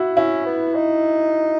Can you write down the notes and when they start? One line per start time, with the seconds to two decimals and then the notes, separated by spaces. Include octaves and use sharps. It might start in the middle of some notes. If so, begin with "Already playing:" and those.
Already playing: E4 F#4
0.17 C#4 E4
0.46 B3
0.75 D#4